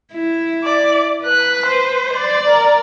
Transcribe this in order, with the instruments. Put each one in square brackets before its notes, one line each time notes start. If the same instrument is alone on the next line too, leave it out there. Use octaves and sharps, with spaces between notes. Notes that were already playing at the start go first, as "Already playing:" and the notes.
[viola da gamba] E4
[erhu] D5
[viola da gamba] B4 [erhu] F#6
[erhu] C5
[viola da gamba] D5
[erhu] A#4